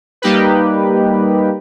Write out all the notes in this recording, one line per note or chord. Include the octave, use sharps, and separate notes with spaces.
G3 A#3 D#4 G4 B4